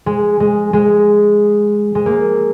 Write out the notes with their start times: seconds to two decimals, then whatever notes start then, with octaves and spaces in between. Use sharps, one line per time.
0.06 G#3
0.40 G#3
0.73 G#3
1.95 G#3
2.06 A#3